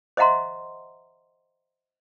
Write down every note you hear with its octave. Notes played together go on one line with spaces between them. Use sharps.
C5 D#5 E5 F#5 A#5 C6